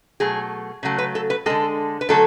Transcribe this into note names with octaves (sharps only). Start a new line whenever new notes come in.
B2 F#3 A3 G#4
C#3 F#3 A3
B4
A4
B4
D3 G#3 A4
B4
D3 F#3 A3 A4